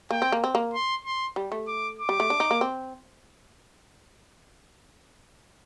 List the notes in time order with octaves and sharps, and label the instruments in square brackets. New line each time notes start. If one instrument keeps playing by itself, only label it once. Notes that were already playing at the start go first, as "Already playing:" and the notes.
[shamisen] A#3 [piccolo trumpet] G5
[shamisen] C4
A#3
C4
A#3
[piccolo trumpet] C6
C6
[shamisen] G3
A3
[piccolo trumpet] D6
D6
[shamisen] G3
A3
D4
D#4
A#3
C4